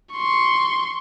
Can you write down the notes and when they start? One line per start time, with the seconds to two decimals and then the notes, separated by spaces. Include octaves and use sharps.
0.14 C6 C#6